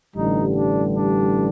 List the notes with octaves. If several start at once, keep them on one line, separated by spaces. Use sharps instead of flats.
A1 G2 D3 G3 D#4
D4
D4